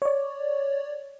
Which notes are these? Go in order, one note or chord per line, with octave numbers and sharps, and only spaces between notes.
C#5 D5